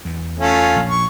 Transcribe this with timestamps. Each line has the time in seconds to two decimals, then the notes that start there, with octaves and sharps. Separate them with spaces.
0.05 E2
0.39 A3 C#4 F4
0.76 A#1
0.90 C#6